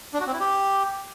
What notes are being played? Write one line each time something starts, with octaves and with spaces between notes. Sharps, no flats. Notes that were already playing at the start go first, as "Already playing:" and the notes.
D4
F#4
C4
E4
G4